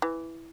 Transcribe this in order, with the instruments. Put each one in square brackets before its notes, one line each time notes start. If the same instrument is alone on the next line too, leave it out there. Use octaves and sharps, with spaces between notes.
[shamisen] E3